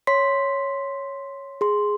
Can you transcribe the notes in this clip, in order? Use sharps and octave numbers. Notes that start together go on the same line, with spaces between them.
C#5 C6 B6 C7
G#4 C6